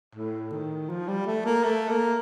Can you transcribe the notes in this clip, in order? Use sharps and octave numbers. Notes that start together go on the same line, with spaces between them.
A2
D#3
F3
G3
A3
A#3
A3
A#3